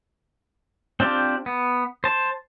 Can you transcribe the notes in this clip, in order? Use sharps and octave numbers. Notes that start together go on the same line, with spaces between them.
C4 D4 F4 G4
B3
C5 A5